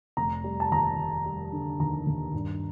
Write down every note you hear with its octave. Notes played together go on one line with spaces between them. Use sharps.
F1 A#5
G3
A5
D#2 A#5
F1
G3
D3
D#2 A#5
D#2
G2